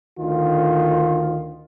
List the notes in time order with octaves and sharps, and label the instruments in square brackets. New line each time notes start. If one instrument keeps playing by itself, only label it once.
[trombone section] D2 D#3 F4